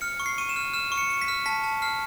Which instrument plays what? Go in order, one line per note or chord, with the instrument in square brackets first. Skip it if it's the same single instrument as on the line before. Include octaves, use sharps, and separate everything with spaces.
[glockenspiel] F6 C#7
C#6
C7
C#6 D#7
E7
F6
F6 E7
C#6
C#7
C#6
B6
F6
A5 B6
A5
F6 C7